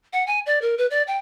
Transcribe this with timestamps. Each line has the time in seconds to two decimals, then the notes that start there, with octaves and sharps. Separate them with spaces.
0.13 F#5
0.27 G#5
0.46 D5
0.62 A#4
0.78 B4
0.91 D5
1.07 G5